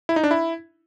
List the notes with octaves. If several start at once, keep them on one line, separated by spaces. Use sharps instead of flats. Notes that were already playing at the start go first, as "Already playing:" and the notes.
E4
D#4
D4
E4